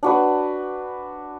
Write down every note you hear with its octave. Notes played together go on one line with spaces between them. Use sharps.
D4 F#4 B4